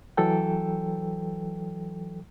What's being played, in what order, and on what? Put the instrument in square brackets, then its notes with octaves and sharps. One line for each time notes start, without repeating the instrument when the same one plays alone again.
[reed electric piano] E3 F#3 A4 G5